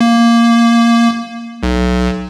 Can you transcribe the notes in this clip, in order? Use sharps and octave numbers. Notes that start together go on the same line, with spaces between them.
A#3
B1